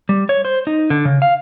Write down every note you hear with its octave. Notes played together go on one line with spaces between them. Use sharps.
G3
C#5
C5
D#4
D3
C#3
F5